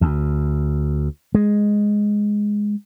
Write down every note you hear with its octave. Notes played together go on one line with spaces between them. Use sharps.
D2
G#3